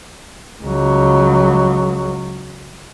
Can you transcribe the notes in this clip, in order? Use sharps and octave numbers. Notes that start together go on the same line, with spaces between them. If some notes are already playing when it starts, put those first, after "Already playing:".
C#2 F#3